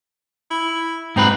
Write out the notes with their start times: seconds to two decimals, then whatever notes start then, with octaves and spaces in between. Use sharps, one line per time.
0.51 E4
1.16 G#2 C4 D#4 B4